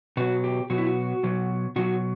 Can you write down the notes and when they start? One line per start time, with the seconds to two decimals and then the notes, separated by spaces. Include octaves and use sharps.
0.17 B2 F#3 F#4
0.44 G4
0.70 B2 F#3 F#4
0.78 E4
0.87 F#4
1.23 B2 F#3
1.76 B2 F#3 F#4